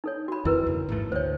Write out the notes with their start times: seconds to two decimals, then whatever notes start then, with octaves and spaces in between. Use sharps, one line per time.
0.04 D#4 A4 C#5
0.28 F#4 B5
0.45 F2 D#3 E4 A#4 B4
0.67 E2 G2 C#3
0.89 A1 G#2 A3
1.12 D2 C5 C#5